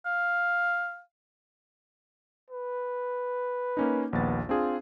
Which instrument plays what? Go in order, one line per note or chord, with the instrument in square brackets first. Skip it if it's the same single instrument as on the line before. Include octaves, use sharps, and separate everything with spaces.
[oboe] F5
[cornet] B4
[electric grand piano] A#3 C#4 D#4
[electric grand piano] A#1 D#2 A6 [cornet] B3
[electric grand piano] C4 D4 G#4 [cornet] F4